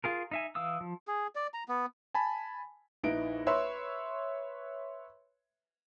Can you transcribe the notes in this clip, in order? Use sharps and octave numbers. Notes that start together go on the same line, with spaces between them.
F4 G#4 A#4
D#4 E5 G#5
E3 F5 D#6 E6
F3
G#4
D5
A#5
B3
G#5 A5 B5
A#1 D#4 E4 B4 D7
B4 C#5 E5 B5 C6 E6